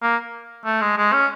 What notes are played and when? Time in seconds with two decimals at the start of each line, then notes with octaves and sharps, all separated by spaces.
0.02 A#3
0.65 A3
0.81 G#3
0.97 G#3
1.13 C#4